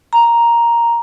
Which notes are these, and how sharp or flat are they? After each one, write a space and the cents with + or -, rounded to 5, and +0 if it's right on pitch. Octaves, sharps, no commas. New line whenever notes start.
A#5 +5